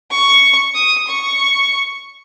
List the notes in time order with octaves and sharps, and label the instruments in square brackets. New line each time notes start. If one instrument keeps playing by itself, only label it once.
[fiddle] C#6
D#6
C#6